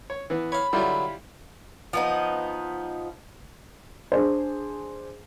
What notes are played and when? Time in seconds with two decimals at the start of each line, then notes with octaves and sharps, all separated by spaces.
0.10 C#5
0.30 E3 B3
0.52 C#5 F5 B5
0.73 D3 F#3 G3 E4 F4
1.93 F3 B3 D#4
4.12 D4 G#4 C5